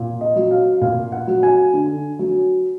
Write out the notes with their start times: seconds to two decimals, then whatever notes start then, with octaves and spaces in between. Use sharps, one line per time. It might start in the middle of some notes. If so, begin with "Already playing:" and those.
Already playing: A#2
0.21 D#5
0.36 F#3
0.51 F5
0.81 A#2 F5
1.12 F#5
1.27 F#3
1.43 G#5
1.74 D3
2.19 F#3